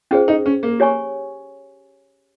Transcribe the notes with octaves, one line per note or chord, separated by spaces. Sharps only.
C#4 F4 G#4 C5
D#4
C#4
A#3
G4 C#5 G#5 C#6